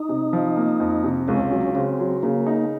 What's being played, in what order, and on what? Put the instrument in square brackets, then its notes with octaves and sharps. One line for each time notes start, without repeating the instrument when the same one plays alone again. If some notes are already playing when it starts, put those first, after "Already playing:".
Already playing: [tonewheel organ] D#4
[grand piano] C3
F3
A#3
F2
C3
[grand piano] C#2 [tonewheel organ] C#4
[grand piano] F#3
[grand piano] C#3 [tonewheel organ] C4
[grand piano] F#3
[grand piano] C#3 [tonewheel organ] A#3
[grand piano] D#4